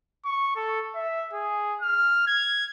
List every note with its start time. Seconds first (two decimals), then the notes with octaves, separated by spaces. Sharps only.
0.25 C#6
0.56 A4
0.95 E5
1.33 G#4
1.81 F6
2.27 G#6